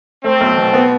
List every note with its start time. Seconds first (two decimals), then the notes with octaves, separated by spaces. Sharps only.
0.24 A3 C4
0.41 B1
0.57 B2
0.74 B3